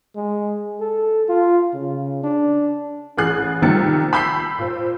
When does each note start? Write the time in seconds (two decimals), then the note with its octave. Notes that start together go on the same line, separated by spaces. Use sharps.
0.16 G#3
0.80 A4
1.29 F4
1.74 C#3
2.23 D4
3.17 A1 G#4 F#6 C7
3.62 C3 D#3 F3 G3 A6 C#7
4.13 B5 E6 G6 B6 C7
4.59 A#2 C5